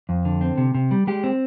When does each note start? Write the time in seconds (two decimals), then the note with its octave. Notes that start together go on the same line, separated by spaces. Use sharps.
0.09 F2
0.25 D3
0.41 C4
0.58 C3
0.75 C3
0.91 G3
1.07 G#3 G4
1.24 C4